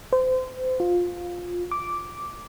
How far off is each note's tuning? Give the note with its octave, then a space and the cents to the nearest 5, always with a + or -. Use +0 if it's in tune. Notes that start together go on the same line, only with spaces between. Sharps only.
C5 -30
F4 +15
D6 -5